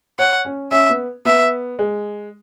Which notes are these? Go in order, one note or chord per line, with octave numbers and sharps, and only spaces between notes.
C#5 F#5
C#4
C#4 E5
B3
B3 E5
G#3